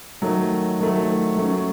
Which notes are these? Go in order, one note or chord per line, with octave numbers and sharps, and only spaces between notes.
D#3 F#3 A3
D#3 F#3 A3
F#3 A3 C#4